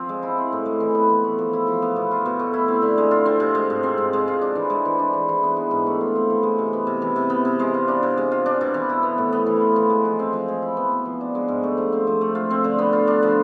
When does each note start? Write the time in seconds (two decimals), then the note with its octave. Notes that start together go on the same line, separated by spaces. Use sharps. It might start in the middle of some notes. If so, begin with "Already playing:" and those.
Already playing: F3 C4
0.09 G#3
0.23 E4
0.38 C4
0.52 A2
0.66 G#3
0.80 E3
0.95 B3
1.10 E3
1.24 A3
1.38 F3
1.53 E4
1.67 F3
1.82 B3
1.96 B2
2.11 F4
2.26 B2
2.39 A3
2.53 E4
2.68 C4
2.82 D3
2.98 G#3
3.11 F4
3.25 C4
3.40 C3
3.55 G#3
3.70 G#2
3.83 C4
3.98 G#2
4.13 G#3
4.28 F4
4.41 D4
4.55 E3
4.70 G#3
4.85 E3
4.99 D4
5.13 E3
5.29 E3
5.43 B3
5.56 G#3
5.71 G#2
5.87 A3
6.01 F4
6.15 C4
6.30 E3
6.43 G#3
6.58 C3
6.73 B3
6.87 C3
7.02 E3
7.16 C3
7.30 B3
7.45 C3
7.59 G#3
7.74 F4
7.88 D4
8.03 C3
8.18 G#3
8.32 F4
8.46 D4
8.61 B2
8.74 E3
8.89 E4
9.03 B3
9.18 A2
9.33 B3
9.46 E3
9.61 F4
9.76 E3
9.90 G#3
10.05 F3
10.19 C4
10.33 F3
10.48 G#3
10.62 E4
10.77 B3
10.92 B2
11.05 F3
11.21 D4
11.35 G#3
11.48 G#2
11.63 A3
11.77 F3
11.92 C4
12.07 F3
12.21 A3
12.35 F4
12.50 C4
12.64 D3
12.78 B3
12.93 F4
13.07 D4
13.23 F3